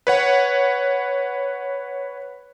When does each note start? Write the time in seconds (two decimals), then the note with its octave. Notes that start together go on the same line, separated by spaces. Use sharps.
0.07 B4 C#5 F#5